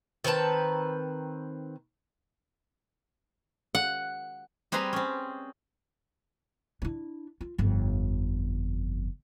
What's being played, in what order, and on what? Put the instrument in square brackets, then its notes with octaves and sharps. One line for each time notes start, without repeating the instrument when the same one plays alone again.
[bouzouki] D#3 C4 B4 A5
[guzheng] F#5
G3 C4 G#4 B4 A#5 C6
C4 C#4
[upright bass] D4 E4
F4
G1 F2